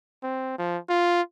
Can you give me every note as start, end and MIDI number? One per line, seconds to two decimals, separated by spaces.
0.23 0.55 60
0.59 0.78 53
0.89 1.22 65